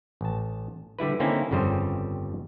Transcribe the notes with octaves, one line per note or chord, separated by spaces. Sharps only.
A1 A5
D3 G3 E4 B4
D3 A#3 C4 C#4 D#4 E4
G1 F2 C#3 G3 C5